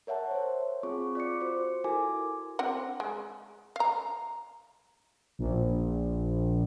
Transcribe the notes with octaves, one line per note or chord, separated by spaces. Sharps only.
A#4 C#5 E5 F#5 A5
C5 C#5
C4 F4 G#4 C#6
F4 D5 D6 C#7
F#4 C5
E4 F#4 A4 A#4 G#5 D6
C4 D4 F#5
G#3
F5 A#5
A#1